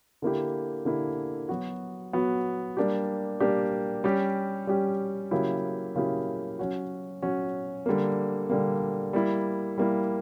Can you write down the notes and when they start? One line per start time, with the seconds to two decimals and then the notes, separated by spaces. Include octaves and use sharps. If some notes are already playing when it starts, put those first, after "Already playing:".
0.22 D3 A#3 E4 G4
0.85 D3 A#3 E4 G4
1.49 F#3 B3 F#4
2.13 F#3 B3 F#4
2.77 G3 A#3 D4 G4
3.40 G3 A#3 D4 G4
4.04 G3 C#4 G4
4.67 G3 C#4 G4
5.31 C#3 F#3 A#3 E4 G4
5.96 C#3 F#3 A#3 E4 G4
6.59 F#3 C#4 F#4
7.22 F#3 C#4 F#4
7.86 D3 G3 A#3
8.50 D3 G3 A#3
9.13 G3 A#3 E4
9.78 G3 A#3 E4